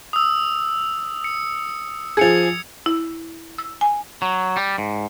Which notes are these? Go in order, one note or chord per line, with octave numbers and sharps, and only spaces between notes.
D#6 E6
C#7
F3 G#4 G#6 C#7 F7
E4
E6
G#5
F#3
G3
G#2